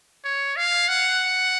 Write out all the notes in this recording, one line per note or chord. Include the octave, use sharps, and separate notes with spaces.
C#5
F5
F#5